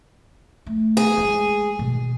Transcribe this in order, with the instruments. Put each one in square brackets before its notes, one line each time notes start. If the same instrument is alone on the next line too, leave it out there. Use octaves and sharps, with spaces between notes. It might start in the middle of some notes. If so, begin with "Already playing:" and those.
[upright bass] A3
[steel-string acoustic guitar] G#4
[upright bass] G#3 E4
B2 D#3